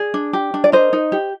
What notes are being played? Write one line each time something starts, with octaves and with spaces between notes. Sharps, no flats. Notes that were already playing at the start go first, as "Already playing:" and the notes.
Already playing: G#4 D5
D4
G4
D4
D5
A#4 C5 D#5
D#4
G4